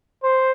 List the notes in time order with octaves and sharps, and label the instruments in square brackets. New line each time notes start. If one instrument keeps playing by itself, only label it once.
[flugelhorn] C5